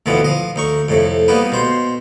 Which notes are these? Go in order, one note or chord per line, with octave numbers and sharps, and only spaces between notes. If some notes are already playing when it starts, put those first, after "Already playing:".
D2 B2 E3 F3 B3
F3 D#5
D2 D#4 C#6
F2 A2 C3
G3 A#3 B3 D#4 B4
B2 C5 C6